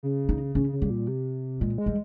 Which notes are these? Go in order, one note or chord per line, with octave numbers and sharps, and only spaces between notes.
C#3
D#4
C#3 C#4
C#3
G3
A#2
C3
A#2 G#3
G#3
G3